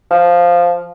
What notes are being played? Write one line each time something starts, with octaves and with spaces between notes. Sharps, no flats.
F3